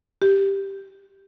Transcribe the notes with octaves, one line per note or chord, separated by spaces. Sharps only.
G4